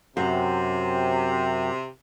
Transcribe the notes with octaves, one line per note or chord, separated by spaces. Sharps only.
F#2 C3